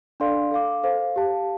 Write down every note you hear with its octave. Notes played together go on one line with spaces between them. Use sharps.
D4 A4 D5 F5 C6
A4 F5 D6
A4 C5 F5
G4 F5 A5